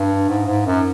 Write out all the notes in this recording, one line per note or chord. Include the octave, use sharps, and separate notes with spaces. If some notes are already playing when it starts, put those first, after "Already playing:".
Already playing: G2
G#2
G#2
F#2